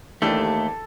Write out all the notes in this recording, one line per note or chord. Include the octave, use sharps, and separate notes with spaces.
D#2 E3 A3 D4 G4 A4